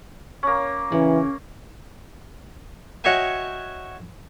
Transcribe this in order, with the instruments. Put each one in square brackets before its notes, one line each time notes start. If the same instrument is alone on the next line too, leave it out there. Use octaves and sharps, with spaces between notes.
[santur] A#3 C#4
[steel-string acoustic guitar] C#3 [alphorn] E3
[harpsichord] F#4 C#5 D#5 E5 G5 G#5